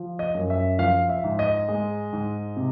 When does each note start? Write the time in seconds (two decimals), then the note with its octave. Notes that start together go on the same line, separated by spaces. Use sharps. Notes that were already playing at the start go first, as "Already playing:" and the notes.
Already playing: F3
0.19 D#5
0.35 F#2
0.50 E5
0.79 F3 F5
1.09 E5
1.24 G#2
1.39 D#5
1.68 G#3
2.13 G#2
2.56 C3